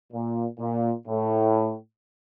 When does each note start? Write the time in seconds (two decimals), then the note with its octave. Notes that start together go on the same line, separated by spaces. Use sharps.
0.13 A#2
0.60 A#2
1.08 A2